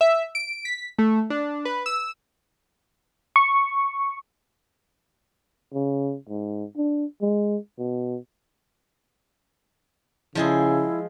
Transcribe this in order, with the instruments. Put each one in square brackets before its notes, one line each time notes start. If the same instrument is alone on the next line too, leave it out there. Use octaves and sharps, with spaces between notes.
[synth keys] E5
D7
B6
A3
D4
B4
E6
[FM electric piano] C#6
[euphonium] C#3
G#2
D4
G#3
B2
[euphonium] C#3 [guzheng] F3 G#3 G#4 [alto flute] E4